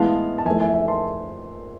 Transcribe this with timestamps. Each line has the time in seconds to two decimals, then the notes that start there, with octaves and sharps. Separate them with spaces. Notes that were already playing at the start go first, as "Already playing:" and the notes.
Already playing: A2 E3 G#3 B3 F5 A5
0.38 A5
0.46 F2 E3 A3 E5 G#5
0.60 E5 G#5
0.74 E5 G#5
0.88 A5 C6